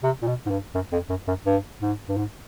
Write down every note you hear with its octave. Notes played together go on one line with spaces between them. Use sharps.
C3
A#2
B2
G#2
G2
F#2
F2
F#2
F#2
G2
G#2
G2
G#2